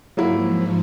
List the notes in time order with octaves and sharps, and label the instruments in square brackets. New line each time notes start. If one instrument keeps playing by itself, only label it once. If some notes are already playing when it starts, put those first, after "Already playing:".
[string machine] G#2 F3 [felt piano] F#3 A#3 E4